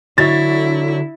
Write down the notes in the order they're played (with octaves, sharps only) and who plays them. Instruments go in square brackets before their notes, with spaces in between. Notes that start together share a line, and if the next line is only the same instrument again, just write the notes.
[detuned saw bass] D3 [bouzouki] F#3 C#5 [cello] E4 [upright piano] A6